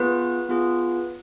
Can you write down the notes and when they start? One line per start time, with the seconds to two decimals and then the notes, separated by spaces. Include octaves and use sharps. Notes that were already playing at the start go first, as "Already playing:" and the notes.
Already playing: B3 F4 G#4 B4
0.49 B3 F4 G#4